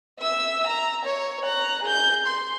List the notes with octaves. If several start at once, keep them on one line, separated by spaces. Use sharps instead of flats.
E5 E6
A#5
C#5
A#5 F#6
G#4 G6
C6